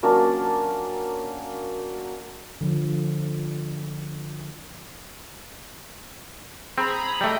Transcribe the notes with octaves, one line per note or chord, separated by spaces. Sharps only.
F#3 A#3 C#4 D4
D3 F3
C4 G#4 A#5 B5
G3 A3 D#5 G5